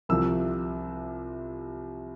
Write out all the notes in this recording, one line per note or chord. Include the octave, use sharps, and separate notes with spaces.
C2 C3 F3 E6